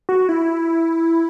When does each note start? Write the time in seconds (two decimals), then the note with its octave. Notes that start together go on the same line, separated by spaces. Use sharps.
0.09 F#4
0.29 E4